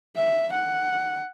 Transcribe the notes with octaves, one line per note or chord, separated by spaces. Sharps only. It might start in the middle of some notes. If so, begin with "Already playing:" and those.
E5
F#5